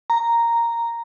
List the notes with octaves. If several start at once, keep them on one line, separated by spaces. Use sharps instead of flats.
A#5